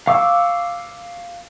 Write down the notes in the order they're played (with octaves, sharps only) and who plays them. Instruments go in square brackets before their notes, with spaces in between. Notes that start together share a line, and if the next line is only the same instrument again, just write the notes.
[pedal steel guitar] F5 C#6 D6 E6